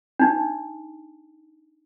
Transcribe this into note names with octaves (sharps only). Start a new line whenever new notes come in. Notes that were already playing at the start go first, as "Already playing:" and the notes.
D4 D#4